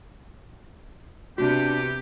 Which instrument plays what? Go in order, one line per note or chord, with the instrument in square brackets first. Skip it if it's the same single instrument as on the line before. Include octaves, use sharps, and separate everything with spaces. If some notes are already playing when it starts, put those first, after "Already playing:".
[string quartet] C3 B3 [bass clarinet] D4 [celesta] F#4 [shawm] G4